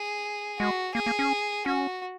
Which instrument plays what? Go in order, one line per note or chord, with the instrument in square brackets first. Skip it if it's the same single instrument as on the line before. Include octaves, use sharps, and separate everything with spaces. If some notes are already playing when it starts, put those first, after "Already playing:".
Already playing: [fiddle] G#4
[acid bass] G#3 [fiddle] F#4
[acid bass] A#3 [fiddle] G#4
[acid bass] A#3
C#4
[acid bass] C#4 [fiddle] F#4